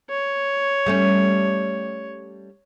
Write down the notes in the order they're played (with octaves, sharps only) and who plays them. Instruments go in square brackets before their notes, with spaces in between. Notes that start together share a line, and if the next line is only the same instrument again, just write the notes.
[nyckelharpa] C#5
[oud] G3 A3 C#4